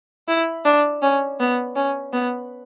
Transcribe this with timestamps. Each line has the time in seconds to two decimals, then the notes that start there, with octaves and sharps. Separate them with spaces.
0.28 E4
0.65 D4
1.02 C#4
1.40 B3
1.76 C#4
2.13 B3